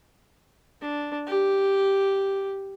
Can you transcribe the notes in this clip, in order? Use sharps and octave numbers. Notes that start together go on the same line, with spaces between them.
D4
G4